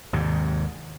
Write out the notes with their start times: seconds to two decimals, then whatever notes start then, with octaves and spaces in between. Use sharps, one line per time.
0.13 D#2 G#2 C3